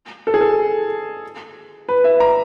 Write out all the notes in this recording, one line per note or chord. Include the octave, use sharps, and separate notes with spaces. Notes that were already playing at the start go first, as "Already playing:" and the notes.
A4
G#4
A4
B4
E5
A#5